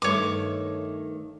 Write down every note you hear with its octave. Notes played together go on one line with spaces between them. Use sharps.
G2 D#3 A3 C#5 D6